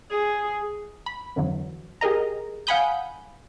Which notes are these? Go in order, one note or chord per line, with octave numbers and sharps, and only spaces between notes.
G#4
B5
F2 D3 E3 F#3
G4 G#4 A#4 D#5 A#5
F5 F#5 G#5 B5 D#6 G6